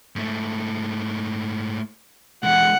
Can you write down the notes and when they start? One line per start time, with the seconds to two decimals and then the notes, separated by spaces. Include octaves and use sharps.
0.16 G#2 A3
2.44 E3 G#3 F#5